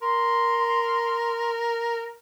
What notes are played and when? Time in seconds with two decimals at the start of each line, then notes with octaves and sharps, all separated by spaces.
0.02 A#4 C6